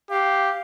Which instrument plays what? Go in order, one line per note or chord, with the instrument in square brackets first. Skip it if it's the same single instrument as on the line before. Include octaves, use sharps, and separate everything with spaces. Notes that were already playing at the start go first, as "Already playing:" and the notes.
[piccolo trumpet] G4 [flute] F5